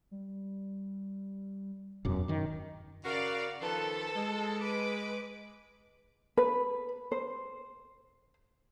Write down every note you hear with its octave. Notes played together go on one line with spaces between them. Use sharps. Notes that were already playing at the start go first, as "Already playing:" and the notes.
G3
E1 F#2 D6
F#2 D#3
C#3 F#4 A#4 D5 F5
D#3 F3 A4 B4
G#3
B4 D6
B4
C5